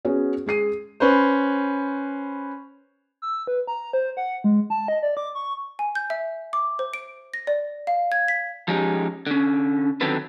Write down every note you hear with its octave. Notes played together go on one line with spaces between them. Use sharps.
B3 C#4 F#4 G#4
G#3 G#4 C7 D#7
C#4 B4 C5
E6
B4
A#5
C5
F#5
G#3
A5
D#5
D5
D6
C#6
G#5
G6
E5
D6
C5
D7
A#6
D5
F5
G#6
B6
F3 G#3 C#4 D#4 G4
D3 C#4
D3 D#3 F#3 C4 A4 B4